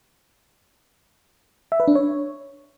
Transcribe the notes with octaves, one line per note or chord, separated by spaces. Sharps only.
E5
B4
D4
C#5